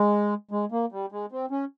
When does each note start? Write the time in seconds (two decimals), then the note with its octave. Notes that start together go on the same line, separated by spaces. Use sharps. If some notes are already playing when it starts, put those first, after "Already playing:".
Already playing: G#3
0.51 G#3
0.72 A#3
0.92 G3
1.12 G#3
1.32 C4
1.51 C#4